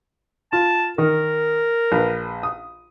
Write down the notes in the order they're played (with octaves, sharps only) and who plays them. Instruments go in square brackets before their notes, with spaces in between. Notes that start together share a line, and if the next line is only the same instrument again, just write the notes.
[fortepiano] F4 [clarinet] A5
[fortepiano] D#3 [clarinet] A#4
[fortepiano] A#1 B4
D#6